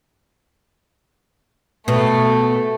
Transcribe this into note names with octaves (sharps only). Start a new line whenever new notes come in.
B2 A3